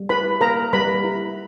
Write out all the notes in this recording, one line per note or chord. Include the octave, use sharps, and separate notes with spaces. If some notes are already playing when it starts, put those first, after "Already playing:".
Already playing: G3
E4 B4 B5
A#3 A#4 A#5
G3 B4 B5
E4